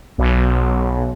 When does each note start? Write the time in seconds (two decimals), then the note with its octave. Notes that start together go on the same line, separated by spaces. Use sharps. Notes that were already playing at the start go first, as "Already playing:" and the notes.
0.18 B1